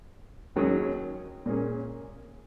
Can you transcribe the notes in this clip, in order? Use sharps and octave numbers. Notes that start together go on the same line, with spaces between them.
D#2 D#3 F#3 C#4 G#4
A#2 A#3 C#4 G#4